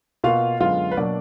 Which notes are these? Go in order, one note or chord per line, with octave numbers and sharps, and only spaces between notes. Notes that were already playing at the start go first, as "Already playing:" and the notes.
B2 A#3 F4 F5
F#2 D3 G#3 B3 F4 F5
B4
B2 F#3 A#3 D4 D5